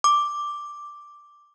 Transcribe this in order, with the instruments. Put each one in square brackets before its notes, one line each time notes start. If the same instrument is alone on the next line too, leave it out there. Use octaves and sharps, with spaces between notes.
[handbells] D6